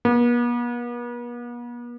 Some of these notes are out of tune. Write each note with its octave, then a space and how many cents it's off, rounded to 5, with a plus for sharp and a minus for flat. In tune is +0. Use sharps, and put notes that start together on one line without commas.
B3 -45